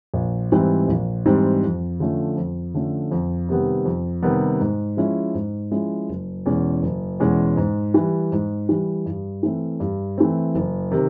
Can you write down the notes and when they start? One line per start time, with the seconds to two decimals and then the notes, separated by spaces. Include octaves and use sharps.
0.14 A#1
0.52 G#2 E3 G3 C4
0.88 A#1
1.26 G#2 E3 G3 C4
1.63 F2
2.00 D3 F3 A3 C#4
2.36 F2
2.74 D3 F3 A3 C#4
3.11 F2
3.49 C3 D#3 G3 B3
3.85 F2
4.23 C3 D#3 G3 B3
4.61 G#2
4.97 F3 G#3 C#4 E4
5.34 G#2
5.71 F3 G#3 C#4 E4
6.09 F#1
6.46 E2 B2 G#3 C#4
6.83 F#1
7.20 E2 B2 G#3 C#4
7.57 G#2
7.94 E3 G3
8.32 G#2
8.69 E3 G3
9.06 G2
9.43 E3 A3 C4
9.80 G2
10.18 E3 A3 C4
10.55 F#1
10.92 C3 D#3